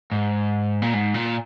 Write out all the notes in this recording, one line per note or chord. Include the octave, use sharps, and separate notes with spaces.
G#2
A#2
G#2
A#2